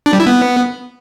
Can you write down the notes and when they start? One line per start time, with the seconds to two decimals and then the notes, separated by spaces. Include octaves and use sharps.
0.06 D4
0.13 G3
0.20 E4
0.27 B3